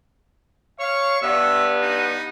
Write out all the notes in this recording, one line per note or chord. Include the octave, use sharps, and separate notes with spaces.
C#5 F5 C#6
G2 B3 E5
D#4